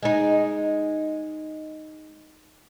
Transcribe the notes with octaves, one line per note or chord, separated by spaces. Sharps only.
G#3 D#4